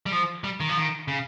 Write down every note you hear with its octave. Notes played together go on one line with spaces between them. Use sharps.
G3
F3
G3
D#3
F3
D#3
C#3